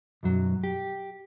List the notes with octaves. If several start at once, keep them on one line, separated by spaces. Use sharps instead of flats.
B1 F#2 F#3
G4